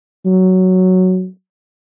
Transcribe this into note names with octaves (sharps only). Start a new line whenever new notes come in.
F#3